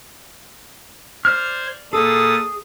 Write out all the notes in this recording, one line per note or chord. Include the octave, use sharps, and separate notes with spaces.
C5 D5 F6 G#6
A#2 G#4 A4 D#6 A6